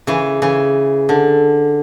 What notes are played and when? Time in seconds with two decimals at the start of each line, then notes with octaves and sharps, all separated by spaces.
0.07 C#3 E3
0.42 C#3 E3
1.09 D3